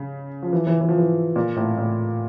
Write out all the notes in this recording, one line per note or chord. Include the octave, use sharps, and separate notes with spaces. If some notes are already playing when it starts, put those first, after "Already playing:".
Already playing: C#3
F3
E3
E3
E3
F3
E3
A#2
A2
A2